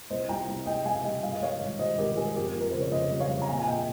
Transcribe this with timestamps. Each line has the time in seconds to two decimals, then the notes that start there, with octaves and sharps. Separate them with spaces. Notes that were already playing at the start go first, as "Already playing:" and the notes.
0.10 C2 C5 D#5
0.29 C2 G5 A#5
0.48 C2
0.66 C2 D#5 G5
0.85 G3 F5 G#5
1.04 G3 D#5 G5
1.23 G2 F5
1.33 D#5
1.42 G3 C#5 F5
1.61 G#1
1.79 G3 C5 D#5
1.98 G#1 G4 A#4
2.17 G3 G#4
2.36 F2 G4 A#4
2.55 F2
2.61 A#4
2.71 C#3 C5
2.81 C#5
2.92 F2 C5 D#5
3.11 G3
3.20 C#5 F5
3.30 F2
3.42 A#5
3.48 A#2 F5 G#5
3.59 G#5
3.67 A#2 D#5 G5